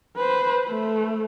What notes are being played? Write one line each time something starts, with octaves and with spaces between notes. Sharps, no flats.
B4 C5
A3